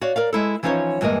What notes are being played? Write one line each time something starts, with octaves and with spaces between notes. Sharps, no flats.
F#4 C#5 D5 F5
A#4 D5 F5
G#3 E4 A4
E3 F3 C#4 D#4 C5 C#5
G2 E3 G#3 A#3 D#5